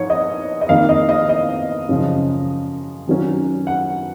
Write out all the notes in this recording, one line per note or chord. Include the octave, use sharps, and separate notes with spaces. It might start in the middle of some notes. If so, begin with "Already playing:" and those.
Already playing: G#2 F3 C#5
D#5
D#5
F2 D#3 A#3 D#4 F5
D#5
D#5
D#5
F#2 C#3 F3
D#3 F#3 C#4
F#5